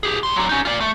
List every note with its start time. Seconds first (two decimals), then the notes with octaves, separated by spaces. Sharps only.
0.03 G4 G#4
0.23 G3 C6
0.36 F#3 D4
0.49 C#4 D#4
0.65 F4 D5
0.80 A3